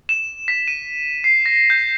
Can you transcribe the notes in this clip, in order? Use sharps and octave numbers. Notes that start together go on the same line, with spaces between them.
E7
B6
D#7
C7
A#6
G6